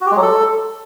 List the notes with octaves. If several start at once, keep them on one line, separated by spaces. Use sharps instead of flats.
F#4
G4
G#3
F#3
A4